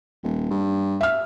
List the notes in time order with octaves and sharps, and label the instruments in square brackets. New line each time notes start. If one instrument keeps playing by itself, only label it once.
[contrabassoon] D#1
G2
[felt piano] E5 F6